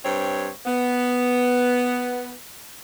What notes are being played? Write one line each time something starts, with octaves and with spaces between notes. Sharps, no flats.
G2 C4 C#5
B3